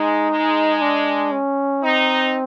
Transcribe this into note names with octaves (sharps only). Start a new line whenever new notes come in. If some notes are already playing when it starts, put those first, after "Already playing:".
Already playing: G#3 D#4
G#3
D4
C#4
C4 D#4